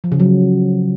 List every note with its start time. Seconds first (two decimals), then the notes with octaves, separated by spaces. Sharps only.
0.04 F3
0.12 C#3
0.20 F#3